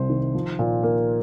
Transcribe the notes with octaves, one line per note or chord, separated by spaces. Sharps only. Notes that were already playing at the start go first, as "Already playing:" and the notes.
Already playing: C2 C3 C5
D#3
F3
A#2
A#3